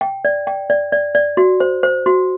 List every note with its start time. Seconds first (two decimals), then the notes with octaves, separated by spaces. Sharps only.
0.01 G5
0.25 D5
0.47 G5
0.70 D5
0.92 D5
1.15 D5
1.37 F#4
1.60 C5
1.83 C5
2.06 F#4